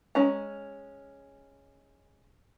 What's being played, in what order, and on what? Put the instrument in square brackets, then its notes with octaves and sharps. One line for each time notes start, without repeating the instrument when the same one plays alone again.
[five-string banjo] G#3 C#4 A#5